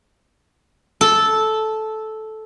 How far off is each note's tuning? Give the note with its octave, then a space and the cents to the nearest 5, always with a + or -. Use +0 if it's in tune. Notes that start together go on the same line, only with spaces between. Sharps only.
A4 -10